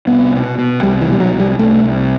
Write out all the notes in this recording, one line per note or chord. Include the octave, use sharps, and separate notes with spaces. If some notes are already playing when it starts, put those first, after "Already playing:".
C2 B3
B2
B2
C2 G3
E3
B2 G3
F#3
C2
G3
C2 A3
C2